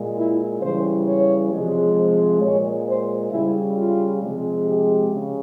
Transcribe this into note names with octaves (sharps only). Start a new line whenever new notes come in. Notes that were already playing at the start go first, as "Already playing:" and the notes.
Already playing: A#2 G#3
E4
C#3 E3 G3 C5
C#5
C3 F3 G#3
C5
A#2 G#3 C#5
C5
C#3 G3 E4
F4
C3 F3 G#3
G4
C#3